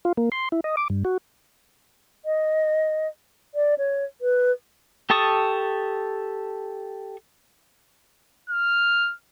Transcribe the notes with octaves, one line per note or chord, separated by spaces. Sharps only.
F4
A#3
C6
E4
D#5
D6
G2
F#4
D#5
D5
C#5
B4
G4 A4 A5 C#6 D#6
F6